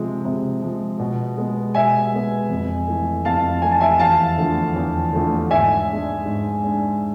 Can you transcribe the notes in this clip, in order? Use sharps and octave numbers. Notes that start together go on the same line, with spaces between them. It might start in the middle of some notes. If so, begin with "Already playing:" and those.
Already playing: C3 F3 G#3
C3
F3 G#3
B2
G#3 B3
B2 E5 G#5
G#3 B3
F2
E3 A3
F2 F5 A5
E3 A3 G#5
A5
E5 G#5
E2 F5 A5
D3 F3 A3
E2
D3 F3 A3
G#2 E5 G#5
G#3 D4
G#2
G#3 D4